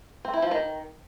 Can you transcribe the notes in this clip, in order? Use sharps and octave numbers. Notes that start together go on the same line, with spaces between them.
C4
E4
F3
D#3